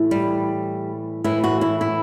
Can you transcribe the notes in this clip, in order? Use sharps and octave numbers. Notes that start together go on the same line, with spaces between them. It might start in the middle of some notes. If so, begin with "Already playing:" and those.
Already playing: A2 E3
G3
A2 E3 E4
F#4
E4
E4